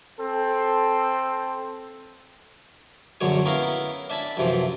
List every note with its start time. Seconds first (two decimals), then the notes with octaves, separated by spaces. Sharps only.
0.20 C4 A4
3.21 A#1 F#2 D3 F#3 C#5 G#5
3.45 B3 C#4 E4 A#4 F5
4.10 D4 E5 G#5 A5 B5
4.37 F#2 C3 E3 F3